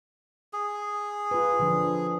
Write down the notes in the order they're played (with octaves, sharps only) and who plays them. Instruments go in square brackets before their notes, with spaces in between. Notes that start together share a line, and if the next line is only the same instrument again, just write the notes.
[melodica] G#4
[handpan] F4 B4
D3 F3 D4